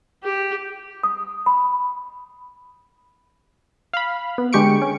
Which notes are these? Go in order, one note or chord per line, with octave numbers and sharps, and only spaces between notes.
G4
D#6
B5
F5 B5
B3
D3 G#3 G4 C#6 C#7 D7
C#4